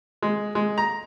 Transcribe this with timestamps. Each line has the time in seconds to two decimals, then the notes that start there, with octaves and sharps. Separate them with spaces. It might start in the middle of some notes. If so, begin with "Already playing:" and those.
0.22 G#3
0.55 G#3
0.78 A#5